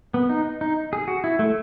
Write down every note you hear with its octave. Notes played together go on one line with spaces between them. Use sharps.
B3
D#4
D#4
G#4
F#4
E4
A3